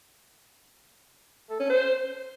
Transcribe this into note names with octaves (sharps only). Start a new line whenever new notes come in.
A4
C#4
C5